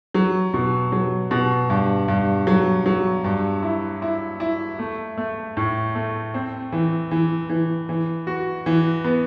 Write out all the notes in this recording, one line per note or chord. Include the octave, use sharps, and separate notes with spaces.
F#3
B2
F#3
B2
G2
G2
F#3
F#3
G2
E4
E4
E4
A3
A3
A2
A3
C4
E3
E3
E3
E3
F#4
E3
B3